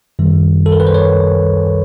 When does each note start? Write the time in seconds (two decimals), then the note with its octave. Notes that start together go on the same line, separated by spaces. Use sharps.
0.19 F#2 D#3 G3
0.66 A4
0.72 A#4
0.80 B4
0.87 C5
0.94 B4 C#5